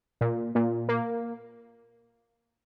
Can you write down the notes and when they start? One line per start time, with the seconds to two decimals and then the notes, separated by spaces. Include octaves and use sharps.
0.21 A#2
0.55 A#2
0.89 A#3